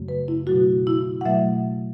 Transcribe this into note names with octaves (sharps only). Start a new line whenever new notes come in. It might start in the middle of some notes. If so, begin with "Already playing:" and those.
Already playing: F#2 C#3 F#3 A3
B4
E4
B2 F#3 A3 F#4
E4
F#5
B2 F#3 A3 E5